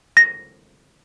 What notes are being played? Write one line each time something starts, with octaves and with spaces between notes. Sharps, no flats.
A#6